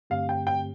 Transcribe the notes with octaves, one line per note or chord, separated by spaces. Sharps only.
G2 D3 A3 C4 G4 F5
G5
G5